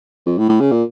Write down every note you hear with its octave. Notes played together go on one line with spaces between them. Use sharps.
F2
A2
A2
C#3
A#2